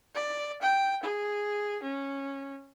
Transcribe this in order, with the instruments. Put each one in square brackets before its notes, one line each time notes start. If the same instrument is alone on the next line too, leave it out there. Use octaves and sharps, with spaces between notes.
[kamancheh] D5
G5
G#4
C#4